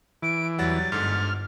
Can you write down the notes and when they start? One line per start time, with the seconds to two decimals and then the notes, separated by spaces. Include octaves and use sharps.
0.22 E3 D7
0.59 E2 F#3 G3 F#5 A6
0.92 G1 G#2 D3 F6